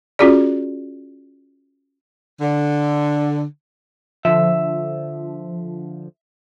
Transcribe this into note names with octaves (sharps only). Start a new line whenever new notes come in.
C#4 F4 F#4 G#4 D5
D3
D3 F3 E5